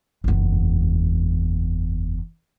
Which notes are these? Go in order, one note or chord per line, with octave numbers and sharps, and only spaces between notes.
F#1 E2